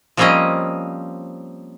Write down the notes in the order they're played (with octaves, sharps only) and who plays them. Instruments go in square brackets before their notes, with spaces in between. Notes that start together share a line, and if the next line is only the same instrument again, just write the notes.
[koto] F3 G3 A#3 C4 C#4 D#5